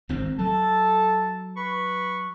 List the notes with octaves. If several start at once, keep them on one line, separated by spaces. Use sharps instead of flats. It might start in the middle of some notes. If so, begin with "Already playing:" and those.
G#1 G#2 C4
F#3 A4 A5
B4 B5 C#6